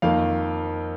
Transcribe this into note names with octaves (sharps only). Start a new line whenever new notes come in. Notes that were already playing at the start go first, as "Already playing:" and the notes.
F2 D#3 A#3 F5